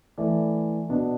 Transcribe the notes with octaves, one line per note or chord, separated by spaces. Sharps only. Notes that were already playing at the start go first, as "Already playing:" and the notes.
E3 A3 E4 D5
B2 B3 D4